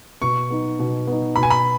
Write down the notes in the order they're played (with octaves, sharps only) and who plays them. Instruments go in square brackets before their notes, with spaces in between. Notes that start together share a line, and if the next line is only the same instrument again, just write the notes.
[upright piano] B2 [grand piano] C#6
[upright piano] B3 D#4
B2
B3 D#4
[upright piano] B2 [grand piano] B5
[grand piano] G#5
B5